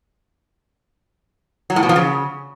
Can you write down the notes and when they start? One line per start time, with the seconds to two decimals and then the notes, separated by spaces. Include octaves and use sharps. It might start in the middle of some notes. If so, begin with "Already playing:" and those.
1.70 F#3
1.76 A2
1.83 B2
1.89 F3
1.96 C#3